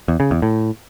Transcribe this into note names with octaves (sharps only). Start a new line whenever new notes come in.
E2
C#3
E2
A2